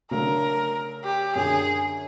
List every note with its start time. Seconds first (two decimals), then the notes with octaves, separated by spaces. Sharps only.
0.11 C#3 F#3 A3 D4 A#4
1.05 G4
1.35 F#2 D3 F#3 G#4